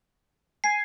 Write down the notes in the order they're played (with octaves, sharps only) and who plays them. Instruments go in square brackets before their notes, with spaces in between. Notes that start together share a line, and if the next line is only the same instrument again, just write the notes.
[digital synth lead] G#5 [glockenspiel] C7